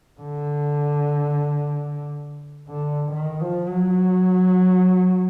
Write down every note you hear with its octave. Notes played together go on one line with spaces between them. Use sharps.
D3
D3
D#3
F3
F#3